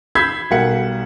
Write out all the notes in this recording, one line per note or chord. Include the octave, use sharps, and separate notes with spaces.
B5 E6 G6 G#6 B6 C7
B1 G3 A#4 F#5 C#7